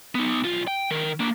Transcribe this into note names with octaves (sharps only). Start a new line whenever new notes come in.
B3 D#4
B1 F4
G5
D#3 A#4
A#3 D4